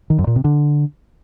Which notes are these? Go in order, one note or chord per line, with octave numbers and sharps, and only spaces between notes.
D#3
F#2
A#2
C3
D3